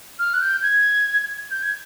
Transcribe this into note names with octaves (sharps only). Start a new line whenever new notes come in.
F6
F#6
G6
G#6
G6
G#6